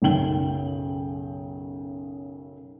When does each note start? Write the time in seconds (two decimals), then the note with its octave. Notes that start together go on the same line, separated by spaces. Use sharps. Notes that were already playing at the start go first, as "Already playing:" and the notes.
0.02 B1 F#2 C#3 G5 F#7 G7